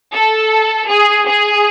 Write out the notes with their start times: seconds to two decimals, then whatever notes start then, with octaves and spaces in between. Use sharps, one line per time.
0.14 A4
0.88 G#4
1.26 G#4